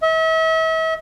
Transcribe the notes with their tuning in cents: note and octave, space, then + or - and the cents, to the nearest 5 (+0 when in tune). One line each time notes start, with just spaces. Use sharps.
E5 -40